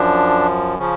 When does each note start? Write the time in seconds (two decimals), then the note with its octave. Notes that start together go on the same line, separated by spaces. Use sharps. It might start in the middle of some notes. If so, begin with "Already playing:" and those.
Already playing: F#2 F3 D4
0.79 C#3 F3 C#4